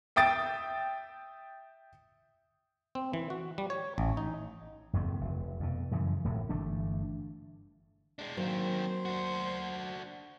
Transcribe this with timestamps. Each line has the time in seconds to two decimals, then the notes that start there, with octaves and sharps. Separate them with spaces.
0.16 E5 G5 D#6 A6 D7
2.95 C4
3.13 E3
3.30 F#4
3.58 G3
3.70 C#5
3.98 A1
4.17 D#4
4.93 F#1 E2 A3 C4
5.21 F1
5.60 F2 B2
5.92 F#2 C#3 E3 F3
6.24 E1 A2 C3
6.49 G1 E3 A3 D4
8.19 G#3 D4
8.37 D#3 F#3 A#3 C4 C5
9.05 D4 F#4